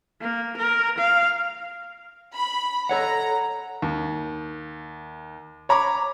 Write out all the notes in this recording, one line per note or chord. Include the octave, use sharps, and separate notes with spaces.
A#3
A#4
F5
B5
A4 C#5 F#5 A#5
D#2
C#5 A#5 B5 D6